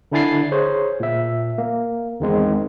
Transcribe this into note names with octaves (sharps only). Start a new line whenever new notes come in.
D3 D4 E4 G#5 A6 C7
G#4 C5 C#5
A#2 E5
A#3
E2 D#3 G#3 C4